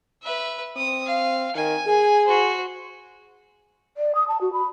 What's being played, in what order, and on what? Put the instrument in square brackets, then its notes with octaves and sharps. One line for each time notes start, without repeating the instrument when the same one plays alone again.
[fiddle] B4 E5
[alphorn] C4 [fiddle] D#6
[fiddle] F5
[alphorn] D#3 [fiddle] G#5
[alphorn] G#4
[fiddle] F#4 C5
[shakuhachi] D5
D#6
A5
F#4
B5